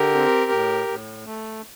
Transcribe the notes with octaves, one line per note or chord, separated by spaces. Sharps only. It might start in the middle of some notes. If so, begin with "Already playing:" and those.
Already playing: D3 G4 A#4
C4
A2
A2
A3